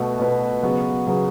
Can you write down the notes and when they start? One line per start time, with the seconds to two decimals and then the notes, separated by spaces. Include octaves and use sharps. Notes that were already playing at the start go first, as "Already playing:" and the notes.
Already playing: B2 A3 F#4 B4
0.19 B2 A3 F#4 B4
0.63 C#3 F#3 B3 F#4
1.07 C#3 F#3 B3 F#4